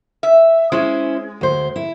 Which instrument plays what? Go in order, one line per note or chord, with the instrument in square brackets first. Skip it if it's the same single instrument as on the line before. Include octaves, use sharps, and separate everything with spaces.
[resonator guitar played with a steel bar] E5
[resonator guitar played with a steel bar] G#3 [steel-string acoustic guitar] C#4 E4 C5
[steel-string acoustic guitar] D2 C5
E4